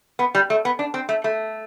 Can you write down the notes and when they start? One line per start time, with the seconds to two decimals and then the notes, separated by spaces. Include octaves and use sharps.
0.19 B3
0.35 G3
0.50 A3
0.65 B3
0.79 D4
0.94 C4
1.09 A3
1.24 A3